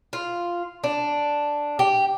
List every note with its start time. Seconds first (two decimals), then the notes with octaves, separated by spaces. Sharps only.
0.13 F4
0.84 D4
1.79 G4